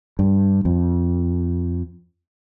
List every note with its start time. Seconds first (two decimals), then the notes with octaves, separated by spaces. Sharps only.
0.19 G2
0.65 F2